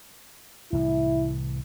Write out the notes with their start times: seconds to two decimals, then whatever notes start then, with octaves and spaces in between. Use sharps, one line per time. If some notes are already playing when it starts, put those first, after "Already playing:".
0.73 C2 A2 E3 E4